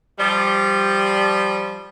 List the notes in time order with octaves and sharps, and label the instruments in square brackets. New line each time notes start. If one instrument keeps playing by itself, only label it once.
[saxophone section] F3 G3